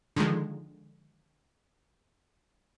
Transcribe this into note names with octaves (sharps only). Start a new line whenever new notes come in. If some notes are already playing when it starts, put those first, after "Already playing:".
D3 D#3 F3 G#3